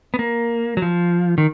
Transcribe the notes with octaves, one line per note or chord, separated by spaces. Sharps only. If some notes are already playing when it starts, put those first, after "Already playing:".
B3
A#3
F#3
F3
D#3